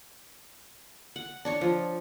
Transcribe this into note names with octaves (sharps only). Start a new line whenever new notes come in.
F#5
D4 C#5 C#6
F3